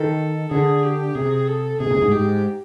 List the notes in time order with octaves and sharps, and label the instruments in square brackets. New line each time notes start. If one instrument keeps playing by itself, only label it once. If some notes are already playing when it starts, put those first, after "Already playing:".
Already playing: [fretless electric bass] D#3 [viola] A4
[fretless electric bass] D3 [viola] G#4
[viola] G4
[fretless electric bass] C3 [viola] G#4
[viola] A4
[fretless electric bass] C3 [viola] G#4
[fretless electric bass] B2
C3
A2
G#2
[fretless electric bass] G#2 [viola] G4